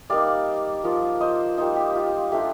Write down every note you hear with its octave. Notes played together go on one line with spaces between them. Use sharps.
G3 A#3 D#4 D5 F5
F3 A#3 F4
C5 D#5
G3 A#3 D#4 F4
G4
F4
A3 D4 F4 G4